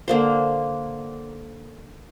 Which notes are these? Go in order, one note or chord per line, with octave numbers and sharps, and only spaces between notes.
D3 A#3 C5